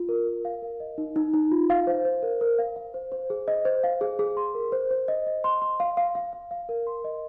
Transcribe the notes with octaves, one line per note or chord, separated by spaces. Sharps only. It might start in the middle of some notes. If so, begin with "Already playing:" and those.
Already playing: F4
A#4
A#4
F5
A#4
D#5
D#4
D#4
D#4
F4
F5
C5
C5
A#4
A#4
F5
F5
C5
C5
G#4
D#5
C5
F5
G#4
G#4
C6
A#4
C5
C5
D#5
D#5
C6
C6
F5
F5
F5
F5
F5
A#4
C6
D#5